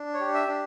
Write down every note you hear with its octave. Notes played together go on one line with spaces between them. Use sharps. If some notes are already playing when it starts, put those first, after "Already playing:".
Already playing: D4
C#5
G4
E5
D4